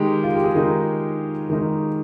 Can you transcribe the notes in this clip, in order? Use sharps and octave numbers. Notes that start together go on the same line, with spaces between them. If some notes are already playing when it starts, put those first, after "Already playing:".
Already playing: D#3 G#3 D#4 G4
F4
G4
G#4
D#3 G#3 D#4 A#4
D#3 G#3 D#4